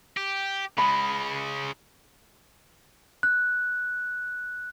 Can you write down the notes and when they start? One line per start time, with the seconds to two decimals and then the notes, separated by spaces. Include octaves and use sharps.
0.17 G4
0.78 C#3 G#3 B5
3.23 F#6